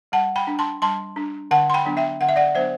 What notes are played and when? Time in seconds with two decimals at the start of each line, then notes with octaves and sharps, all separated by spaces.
0.12 G3 F#5 A5
0.36 G5 B5
0.47 D4
0.59 A5 C6
0.82 G3 A5 C6
1.16 D4
1.51 D3 F#5 A5
1.70 C6
1.74 G5 B5
1.85 F#3 B3 D4
1.97 E5 G5
2.21 D3 F#5
2.29 E5
2.36 D5 F#5
2.55 F#3 B3 D4 C5 E5